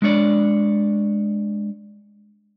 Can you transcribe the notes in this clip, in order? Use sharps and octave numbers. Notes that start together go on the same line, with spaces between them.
G#3 D4 C#5 D5